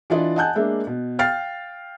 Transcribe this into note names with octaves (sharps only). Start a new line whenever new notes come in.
E3 D4 F4 D5 D#5
D#5 F#5 G#5 A5 F#6 G6
G#3 A#3 D4 E5
B2
F5 G5 F6 A6 C7